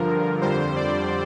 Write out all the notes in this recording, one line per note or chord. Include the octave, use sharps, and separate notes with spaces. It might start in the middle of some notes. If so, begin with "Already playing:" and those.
Already playing: G2 D3 F3 A#4
F2 D3 G3 C5
D5